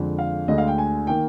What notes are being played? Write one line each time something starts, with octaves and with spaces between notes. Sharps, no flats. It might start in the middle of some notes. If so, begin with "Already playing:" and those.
Already playing: F2 D3 G#3
F5
D2 D3 G#3 D#5
F5
G5
G#5
D#3 A#3 G5